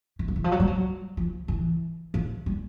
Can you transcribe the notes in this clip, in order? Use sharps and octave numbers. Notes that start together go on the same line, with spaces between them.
E3
F3
E3
F3
F#3
G3
F#3
F3
E3
F3
G3